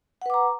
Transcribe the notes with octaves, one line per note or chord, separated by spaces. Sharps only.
B4 F#5 A#5 D6